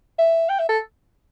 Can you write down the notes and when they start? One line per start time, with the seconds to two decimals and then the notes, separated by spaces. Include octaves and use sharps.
0.19 E5
0.49 G5
0.59 E5
0.69 A4